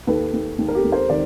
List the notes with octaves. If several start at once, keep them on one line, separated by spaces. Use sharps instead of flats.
D#2 A4 B4
D#2
D#2
A#4
G4 A4
D#2
A#4 C5
D#3 C5 D5